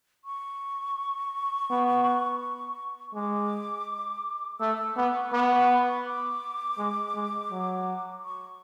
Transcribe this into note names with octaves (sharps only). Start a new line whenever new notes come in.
C#6
B3
G#3 D6
A3 E6
E6
B3 D6
C#6
C#6
B3 D6
C#6
B5
C#6
D6
G#3
G#3
F#3
C#6